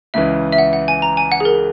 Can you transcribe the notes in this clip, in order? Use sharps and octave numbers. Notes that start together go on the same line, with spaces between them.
C#2 C#3 E3 E5
E5
F#5
F#5
G#5
A#5
G#5
F#5
G#4
A#4